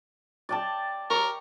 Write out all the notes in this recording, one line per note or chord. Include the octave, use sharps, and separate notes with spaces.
D5 G5 A5
A#4 C#6